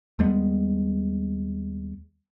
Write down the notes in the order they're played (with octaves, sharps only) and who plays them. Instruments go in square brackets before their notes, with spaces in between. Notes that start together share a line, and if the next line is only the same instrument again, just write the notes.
[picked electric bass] D#2 G3 G#3 B3